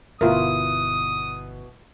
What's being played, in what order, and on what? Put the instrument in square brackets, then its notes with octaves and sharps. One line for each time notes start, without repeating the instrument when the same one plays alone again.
[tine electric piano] G1 [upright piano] B2 E4 [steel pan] F4 A#4 [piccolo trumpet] D#6